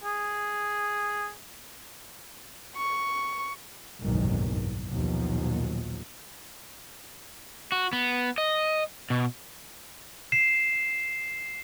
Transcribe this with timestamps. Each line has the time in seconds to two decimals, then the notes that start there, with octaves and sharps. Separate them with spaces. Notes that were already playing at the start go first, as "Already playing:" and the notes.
0.03 G#4
2.75 C#6
4.00 F#1 B1 E2 G#2 D#3 G3
4.88 A#1 D#2 B2 F3 F#3
7.72 F#4
7.93 B3
8.38 D#5
9.10 B2
10.32 C7 E7